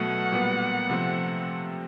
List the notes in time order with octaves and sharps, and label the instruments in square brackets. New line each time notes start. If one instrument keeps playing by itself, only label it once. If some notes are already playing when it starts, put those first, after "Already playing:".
Already playing: [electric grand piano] B2 F#3 A3 [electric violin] F#5
[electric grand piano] A#2 G3 B3
C3 F3 A3 C4